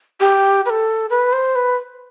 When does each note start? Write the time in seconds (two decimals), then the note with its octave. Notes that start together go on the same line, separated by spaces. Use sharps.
0.20 G4
0.66 B4
0.70 A4
1.10 B4
1.33 C5
1.56 B4